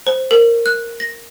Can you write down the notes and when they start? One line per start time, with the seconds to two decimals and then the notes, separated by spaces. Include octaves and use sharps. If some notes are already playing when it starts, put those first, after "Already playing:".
0.07 C5
0.31 A#4
0.66 F#6
1.00 A#6